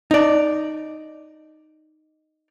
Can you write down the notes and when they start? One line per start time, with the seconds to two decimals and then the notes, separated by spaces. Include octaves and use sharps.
0.11 D#4 D5